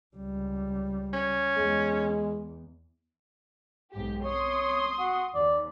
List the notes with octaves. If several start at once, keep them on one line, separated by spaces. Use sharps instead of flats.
C#2 G3
C#4
E2 G#3
B1 G#2 G4
C#5 C6 D#6
F#4
D#2 D5